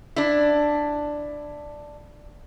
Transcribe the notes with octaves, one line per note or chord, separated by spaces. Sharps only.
D4 E4